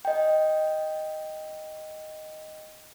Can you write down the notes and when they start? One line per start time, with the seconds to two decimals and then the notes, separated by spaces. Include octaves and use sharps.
0.05 D#5 G5